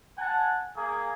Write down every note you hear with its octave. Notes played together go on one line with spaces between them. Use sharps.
F#5 G#5 A5
A#3 G#4